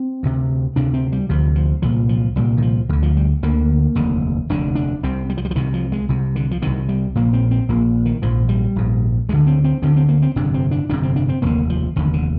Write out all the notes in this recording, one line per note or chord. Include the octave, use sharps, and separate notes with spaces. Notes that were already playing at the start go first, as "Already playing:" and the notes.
Already playing: C4
D2 C3
D2 C3 D4
C4
G3
D2 C3 F3
F3
C2 A#2 F3
F3
C2 A#2 G3
D#3
F3
D2 D3 D#3
F3
G3
D2 D3 A#3
F1 D#2 D3
F1 D#2 D3 D4
D4
C2 C3 C4
G3
F3
G3
F3
C2 C3 D#3
F3
G#3
C2 C3
D3
F3
C2 C3 D#3
G3
A#1 A#2 A#3
C4
C4
A#1 A#2 A#3
D#3
A#1 G#2 F3
G3
A#1 G#2
D2 D3 G#3
C4
C4
D2 D3 C4
C4
A#3
C4
G1 F2 C3 D4
C4
D4
G1 F2 C3 D4
C4
D4
C4
F1 D#2 D3 A#3
F3
F1 D#2 D3 D#3
D3